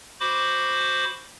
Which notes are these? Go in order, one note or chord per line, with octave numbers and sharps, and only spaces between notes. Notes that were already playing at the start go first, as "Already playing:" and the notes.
F#4 C5 B5 D6